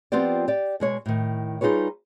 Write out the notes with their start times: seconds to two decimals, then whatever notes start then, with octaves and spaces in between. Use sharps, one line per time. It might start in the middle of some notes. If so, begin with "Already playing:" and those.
0.12 F3 B3 C4 F4 G4 D5
0.48 G4 D5
0.80 B2 G#3 C#5
1.06 A2 D#3
1.61 G3 D#4 F4 G#4 B4 C#5